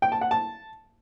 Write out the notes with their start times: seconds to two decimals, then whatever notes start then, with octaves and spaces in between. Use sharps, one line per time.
0.02 G5
0.12 A5
0.21 F#5
0.31 A5